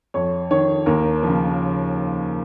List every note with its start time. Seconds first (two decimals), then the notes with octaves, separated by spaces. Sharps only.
0.14 F2 C#5
0.51 D#3 C#5
0.86 D#2 A#4
1.23 C#3 F3